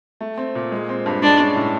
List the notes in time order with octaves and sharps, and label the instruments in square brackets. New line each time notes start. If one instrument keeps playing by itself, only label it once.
[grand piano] A3
C4
A#2
G#3
C4
G2
[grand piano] G#3 [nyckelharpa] D4
[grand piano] C#4
A2